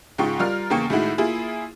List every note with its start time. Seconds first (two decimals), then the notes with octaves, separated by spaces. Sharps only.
0.18 G#2 C#3 F4 G5 C#6
0.39 G3 F4 A#4 F6
0.70 E2 C#3 A#3 G5 C#6 C#7
0.90 A2 D#3 G#3 E4 F#4
1.18 A#3 E4 F4 G#4